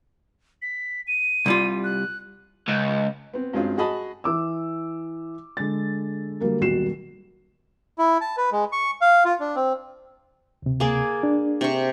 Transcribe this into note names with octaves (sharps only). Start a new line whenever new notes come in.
B6
D#7
C2 G3 F4
F#6
C#2
B3 C4
G2 F#3 G#3 C4 C#4 F4
F#4 G#4 D#5 A5 B5
E3 D6 E6
D3 G#3 A6
D3 F#3 G3 A#3 A#4
D#1 B1 G3 F#4 C7 E7
E4
A5
B4
G#3
C#6
F5
F4
D4
C4
D2 C3
A#3 G#4 D5
D4
C3 C#6